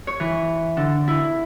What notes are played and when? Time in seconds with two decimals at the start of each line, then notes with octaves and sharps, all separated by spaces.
0.07 C#5
0.20 E3
0.77 D3
1.08 E4